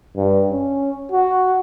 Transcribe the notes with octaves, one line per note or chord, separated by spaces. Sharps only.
G2
C#4
F#4